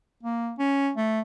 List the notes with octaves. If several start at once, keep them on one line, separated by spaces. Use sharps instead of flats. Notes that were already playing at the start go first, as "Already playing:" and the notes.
A#3
C#4
A3